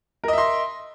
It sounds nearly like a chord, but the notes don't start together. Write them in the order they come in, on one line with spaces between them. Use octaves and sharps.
A#4 D#5 E5 C6